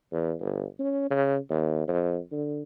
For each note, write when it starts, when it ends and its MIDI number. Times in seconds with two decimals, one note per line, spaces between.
0.12 0.34 40
0.40 0.64 31
0.79 1.06 61
1.11 1.37 49
1.50 1.87 39
1.88 2.19 41
2.32 2.62 50